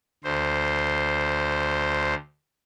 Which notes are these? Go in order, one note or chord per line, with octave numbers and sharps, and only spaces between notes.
D2 C5